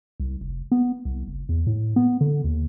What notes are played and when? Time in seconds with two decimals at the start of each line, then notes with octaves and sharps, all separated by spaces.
0.20 C2
0.41 F1
0.72 B3
1.05 C2
1.27 F#1
1.49 E2
1.67 A2
1.96 B3
2.21 D3
2.44 D#2